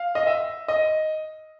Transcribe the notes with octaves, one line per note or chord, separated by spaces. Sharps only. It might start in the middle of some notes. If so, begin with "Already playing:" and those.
Already playing: F5
D#5
E5
D#5